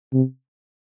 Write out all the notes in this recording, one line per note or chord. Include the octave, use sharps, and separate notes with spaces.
C3